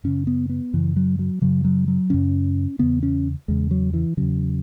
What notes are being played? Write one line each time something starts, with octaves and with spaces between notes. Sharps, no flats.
F#2 C#3 C#4
B3
B3
F#2 C#3 E3
F#3
F#3
F#2 C#3 F#3
F#3
F#3
F#2 C#3 C#4
E2 C#3 B3
C#4
E2 C#3 G#3
F#3
E3
E2 C#3 F#3